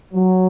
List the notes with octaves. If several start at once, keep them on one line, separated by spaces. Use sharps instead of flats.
F#3